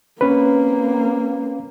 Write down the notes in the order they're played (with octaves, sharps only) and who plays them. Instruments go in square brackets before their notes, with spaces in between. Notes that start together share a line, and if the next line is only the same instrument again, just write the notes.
[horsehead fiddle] A#3 C4 [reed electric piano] C#4 B4